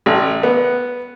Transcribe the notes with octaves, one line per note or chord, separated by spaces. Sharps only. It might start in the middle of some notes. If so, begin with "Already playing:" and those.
A1
B3